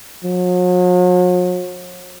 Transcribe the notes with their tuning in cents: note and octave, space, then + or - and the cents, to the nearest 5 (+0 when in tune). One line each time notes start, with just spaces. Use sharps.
F#3 -45